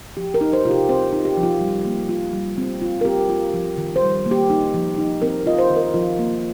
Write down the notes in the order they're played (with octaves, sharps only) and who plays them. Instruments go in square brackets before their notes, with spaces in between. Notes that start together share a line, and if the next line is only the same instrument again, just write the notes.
[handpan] F3 G4
A#4
D#4
C5
C3 F4
G4
C4 C5
D#4
G4
F3
F4
G3
A#3
F4
G3
C4
F4
A#4
C4 G4
F4
F3
D#3
C5
G3
A#3
G4
D#4
F3
D#4
C4 A#4
F4 D#5
C5
D#3
A#4
F3 F4
A#3